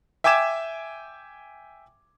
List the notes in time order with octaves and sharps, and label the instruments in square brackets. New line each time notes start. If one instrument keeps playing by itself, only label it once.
[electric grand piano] E5 G5 G#5 D6 G#6 E7